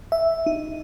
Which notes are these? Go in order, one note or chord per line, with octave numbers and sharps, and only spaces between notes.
E5
D#4